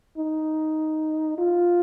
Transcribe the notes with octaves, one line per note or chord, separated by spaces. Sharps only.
D#4
F4